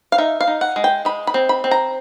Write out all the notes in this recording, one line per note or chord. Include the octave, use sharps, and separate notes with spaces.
F5
D#4 E5
F5
D#4
F#5
G#3
G5
G#3 B5
B5
C4
B5
C4
A#5